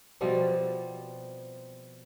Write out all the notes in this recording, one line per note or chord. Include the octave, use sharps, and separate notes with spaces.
B2 F3 G3 C4